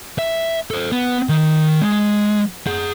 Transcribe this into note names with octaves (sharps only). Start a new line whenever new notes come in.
E5
A4 C5
B3
D#3
G#3
G#4 F#5